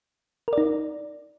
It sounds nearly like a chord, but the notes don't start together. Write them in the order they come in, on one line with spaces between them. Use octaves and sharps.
A#4 D5 D#4